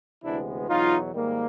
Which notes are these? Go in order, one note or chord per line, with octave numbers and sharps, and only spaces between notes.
D2 C3 E3 G#3 B3 D4 E4
E2 B2 F#3 D#4 F4
G#2 D#3 G3 A#3